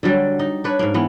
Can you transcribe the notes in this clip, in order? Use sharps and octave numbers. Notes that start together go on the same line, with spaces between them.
D3 F#3 G3
D#4
D4 B4 C#5
G#2 A#3
E3 B3